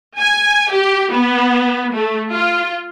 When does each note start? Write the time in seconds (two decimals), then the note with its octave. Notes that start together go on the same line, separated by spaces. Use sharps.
0.19 G#5
0.72 G4
1.13 B3
1.93 A3
2.31 F4